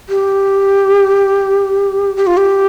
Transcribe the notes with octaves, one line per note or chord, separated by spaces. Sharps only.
G4
G4
F4
G4